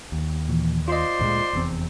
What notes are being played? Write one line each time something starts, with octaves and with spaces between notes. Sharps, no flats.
D#2
A#2 E3
F4 C5 D5 D#5 C6
D2 A#2 G#3
F1 E2 C4